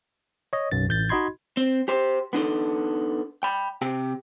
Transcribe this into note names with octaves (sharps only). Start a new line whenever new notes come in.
C#5 D#5
B1 F#2 A6
A1 G6 A6
D#4 F#4 D#5 B5 C6 G#6
C4
G4 C5
B3 D4 D#4 A4
G5 B5
C3 G4 G5